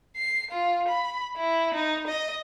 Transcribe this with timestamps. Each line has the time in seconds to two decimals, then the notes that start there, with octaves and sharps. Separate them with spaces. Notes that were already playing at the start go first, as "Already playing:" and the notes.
0.17 C7
0.51 F4
0.88 B5
1.37 E4
1.74 D#4
2.07 D#5